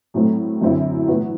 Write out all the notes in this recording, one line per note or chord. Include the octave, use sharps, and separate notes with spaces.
A2 F#3 A3 C4
F#2 D3 F#3 C4 E4
A2 E3 B3 F#4